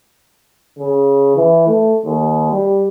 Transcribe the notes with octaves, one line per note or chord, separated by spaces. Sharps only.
C#3
E3
A3
D#2
G3